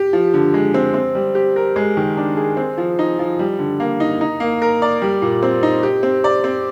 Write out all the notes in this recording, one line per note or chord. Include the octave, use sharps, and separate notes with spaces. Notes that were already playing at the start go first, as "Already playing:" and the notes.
Already playing: G4
F3
D3
G#3
C4
C4
G3
G4
A#4
G#3
D#3
D4
G#4
C4
F3
D#4
F3
G3
D3
A#3
D#4
D#4
A#3
A#4
D5
G3
A#2
C4
D#4
G4
C4
D5
C4